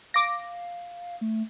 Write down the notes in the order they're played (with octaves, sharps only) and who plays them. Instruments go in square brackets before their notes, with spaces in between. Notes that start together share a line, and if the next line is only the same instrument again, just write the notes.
[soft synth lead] F5 [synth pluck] D6 A#6
[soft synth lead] A3